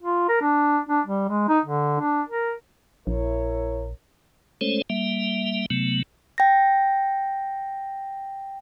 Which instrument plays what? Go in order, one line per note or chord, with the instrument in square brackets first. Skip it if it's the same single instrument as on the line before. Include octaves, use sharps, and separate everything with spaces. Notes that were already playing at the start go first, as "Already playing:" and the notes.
[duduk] F4
A#4
D4
D4
G3
G#3
D#4
D3
D4
A#4
[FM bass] A#1 [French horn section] E4 A#4 C#5
[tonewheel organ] G#3 A3 C#4 A4 C5 C#5
G3 A#3 E5
C3 F#3 A3 B3
[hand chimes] G5 A#6